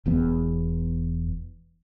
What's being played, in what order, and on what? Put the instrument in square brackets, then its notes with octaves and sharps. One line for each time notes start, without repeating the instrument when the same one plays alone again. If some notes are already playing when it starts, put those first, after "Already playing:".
[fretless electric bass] E1 E2 B3